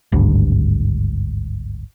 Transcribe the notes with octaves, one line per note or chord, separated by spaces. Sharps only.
G#1 D2 G2